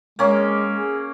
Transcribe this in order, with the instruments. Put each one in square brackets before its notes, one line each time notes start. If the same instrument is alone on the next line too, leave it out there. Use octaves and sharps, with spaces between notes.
[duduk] G#3 [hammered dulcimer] A#3 C#4
[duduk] G#4